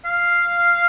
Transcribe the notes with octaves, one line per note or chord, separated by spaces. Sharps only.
F5